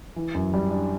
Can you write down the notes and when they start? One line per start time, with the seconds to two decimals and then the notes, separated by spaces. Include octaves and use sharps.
0.16 E3
0.35 F#2
0.53 G3
0.71 D4